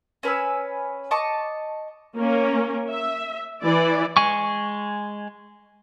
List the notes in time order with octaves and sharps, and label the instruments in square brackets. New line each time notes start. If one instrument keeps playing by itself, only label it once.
[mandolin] C#4 B4 G#5 E6
D#5 A5 C#6 D6
[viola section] A#3 C#4 A#4
E5
E3 E4 D5
[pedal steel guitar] G#3 G#5 C#6